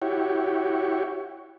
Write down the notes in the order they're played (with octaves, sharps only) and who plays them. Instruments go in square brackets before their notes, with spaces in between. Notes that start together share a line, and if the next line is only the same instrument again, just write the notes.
[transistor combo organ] E4 F#4 G4 C#5